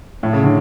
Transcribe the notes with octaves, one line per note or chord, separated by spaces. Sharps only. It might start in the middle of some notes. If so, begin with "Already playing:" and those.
A2
C#3
D3